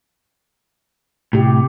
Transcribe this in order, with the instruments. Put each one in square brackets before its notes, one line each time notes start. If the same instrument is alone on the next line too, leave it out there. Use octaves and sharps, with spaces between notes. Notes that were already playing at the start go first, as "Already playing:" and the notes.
[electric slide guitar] A2 [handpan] C3 G4